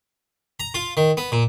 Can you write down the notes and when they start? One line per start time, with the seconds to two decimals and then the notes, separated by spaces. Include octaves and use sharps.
0.60 A#5
0.74 F4
0.97 D#3
1.17 B3
1.32 A#2